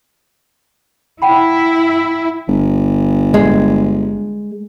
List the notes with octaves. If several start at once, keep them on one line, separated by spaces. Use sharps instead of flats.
E4 F#5 G5 B5
G1
G#3